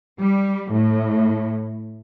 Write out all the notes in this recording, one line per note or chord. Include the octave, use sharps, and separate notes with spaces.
G3
A2